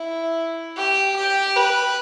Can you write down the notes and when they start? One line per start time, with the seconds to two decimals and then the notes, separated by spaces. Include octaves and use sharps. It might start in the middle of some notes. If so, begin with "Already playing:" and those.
Already playing: E4
0.77 G4
1.16 G4
1.56 B4